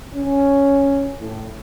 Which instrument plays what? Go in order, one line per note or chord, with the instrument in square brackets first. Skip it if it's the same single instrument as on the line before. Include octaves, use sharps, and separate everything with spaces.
[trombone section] C#4
A2